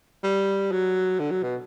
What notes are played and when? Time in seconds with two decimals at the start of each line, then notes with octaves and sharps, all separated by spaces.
0.24 G3
0.72 F#3
1.20 D3
1.31 F#3
1.43 B2